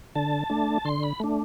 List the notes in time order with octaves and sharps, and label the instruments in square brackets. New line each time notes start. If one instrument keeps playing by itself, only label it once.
[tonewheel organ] D3 A5
A3 D4
D3 C6
B5
A3 D4